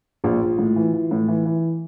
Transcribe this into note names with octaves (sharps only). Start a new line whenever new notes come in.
A#1 F4
A#1
A2
E3
E3
A2
E3
E3